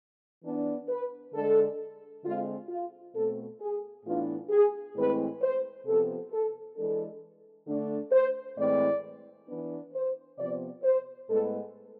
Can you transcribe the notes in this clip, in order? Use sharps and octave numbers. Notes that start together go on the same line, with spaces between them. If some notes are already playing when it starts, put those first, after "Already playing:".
E3 B3 D4
B4
D3 G#3 D4 A4
D3 G#3 C4 F4
F4
B2 A3 C4 A4
G#4
A2 E3 B3 D4 F4
G#4
A2 E3 G#3 C4 B4
C5
C3 F3 B3 A4
A4
E3 G#3 D4 A4
D3 A3 D4
C5
A2 E3 G#3 C4 D5
E3 B3 D4
C5
C3 F3 B3 D5
C5
A2 G#3 B3 A4